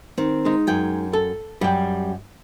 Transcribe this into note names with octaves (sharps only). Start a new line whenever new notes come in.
D#3 C4
G#3 D#4
F#2 G5 G#5
A4
F#2 G3 G5